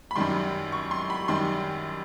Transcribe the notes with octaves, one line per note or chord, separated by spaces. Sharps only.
B5
F#2 D#3 G3 C6
C#6
C6
B5
F#2 D#3 G3 C6